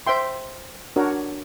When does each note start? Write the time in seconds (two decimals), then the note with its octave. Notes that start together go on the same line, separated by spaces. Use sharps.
0.07 C5 E5 G5 C6
0.96 D4 F#4 A#4 C#5